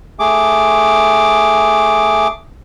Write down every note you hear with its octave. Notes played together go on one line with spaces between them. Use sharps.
A3 G#4 D6